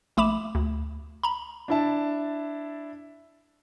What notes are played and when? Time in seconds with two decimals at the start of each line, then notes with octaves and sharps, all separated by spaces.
0.17 A#1 A3 B5 D6 E7
0.55 D2
1.23 A#5 B5
1.68 D4 E4 A5